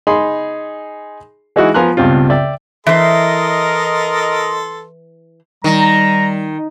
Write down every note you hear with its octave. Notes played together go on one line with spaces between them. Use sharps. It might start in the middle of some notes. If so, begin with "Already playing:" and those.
D#4 G#4 B5 C6
E3 G#3 D#4 E4 F#4
F3 B3 G#5 A#5 C6 F#6
C#2 G2 B2 C4 F4
D5 E5 G5
E3 A4 A#4 C5 D#5 E5 C6
D#3 G3 A#5